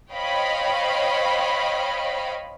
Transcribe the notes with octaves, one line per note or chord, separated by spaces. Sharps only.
C5 C#5 D#5 F5 G5 B5